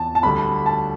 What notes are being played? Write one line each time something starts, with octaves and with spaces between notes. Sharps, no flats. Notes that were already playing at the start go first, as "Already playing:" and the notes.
Already playing: E2 A5
A5
D2 D3 G3 B5
A5